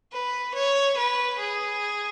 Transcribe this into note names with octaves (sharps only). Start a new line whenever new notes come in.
B4
C#5
B4
G#4